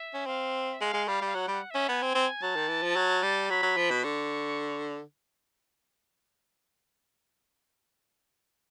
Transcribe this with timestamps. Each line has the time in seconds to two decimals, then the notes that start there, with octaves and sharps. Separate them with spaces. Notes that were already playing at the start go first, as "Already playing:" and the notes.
Already playing: E5
0.14 C#4
0.26 C4 F5
0.74 E5
0.81 G#3 F5
0.94 G#3
1.07 G3 F5
1.22 G3 F5
1.34 F#3 F#5
1.48 G3 F#5
1.71 C#4 E5
1.89 B3 G#5
2.02 C4
2.15 C4
2.42 F#3 A5
2.56 D#3
2.69 E3
2.83 F3
2.96 F#3
3.23 G3
3.50 F#3 B5
3.63 F#3
3.77 F3
3.91 B2
4.04 D3 C#6